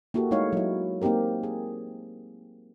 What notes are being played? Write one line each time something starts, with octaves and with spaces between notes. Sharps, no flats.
A#3 E4 F#4 G4 A4
G#3 A3 D#4 E4 C#5 F5
F#3 E4
A#3 C4 D#4 G4 A#4
G#4